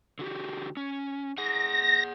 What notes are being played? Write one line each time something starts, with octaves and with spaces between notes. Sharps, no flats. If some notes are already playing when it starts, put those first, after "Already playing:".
D3 F#4 G4
C#4
G#4 F#5 A#6